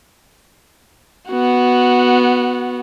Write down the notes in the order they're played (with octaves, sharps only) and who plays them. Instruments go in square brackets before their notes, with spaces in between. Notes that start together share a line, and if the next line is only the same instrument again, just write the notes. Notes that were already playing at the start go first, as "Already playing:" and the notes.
[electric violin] B3 F#4